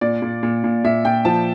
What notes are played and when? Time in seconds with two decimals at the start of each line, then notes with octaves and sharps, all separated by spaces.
0.01 A#2 D5
0.22 A#2
0.43 A#2
0.64 A#2
0.84 A#2 E5
1.05 A#2 G5
1.25 F3 A5